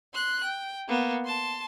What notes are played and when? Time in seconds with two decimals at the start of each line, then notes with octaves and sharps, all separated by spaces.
0.14 C6 F#6
0.44 G5
0.89 A#3 B3
1.25 A5 C6